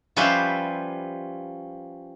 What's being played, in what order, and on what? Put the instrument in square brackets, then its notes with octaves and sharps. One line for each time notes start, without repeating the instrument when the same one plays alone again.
[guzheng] F3 G3 C#4 B4 C5 E5